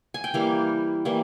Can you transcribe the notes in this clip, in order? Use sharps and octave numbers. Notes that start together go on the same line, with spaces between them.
G#5
G5
E3 G3 A#3 F5
E3 G3 A#3